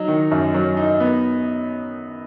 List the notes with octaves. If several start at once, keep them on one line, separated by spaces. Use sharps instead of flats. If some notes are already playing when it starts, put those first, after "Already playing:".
Already playing: F#3 D#4
D#3
F#2
F#3
D#4
B3